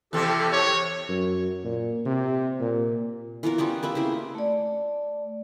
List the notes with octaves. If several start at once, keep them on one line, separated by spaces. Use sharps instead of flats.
E2 C3 C4 G4 A4
C#5
F#2
A#2
C3
A#2
E3 B3 F4 A#4
G3 B3 C#4 F4
A#3 B4 E5
C#3 C4 E4
A3 D5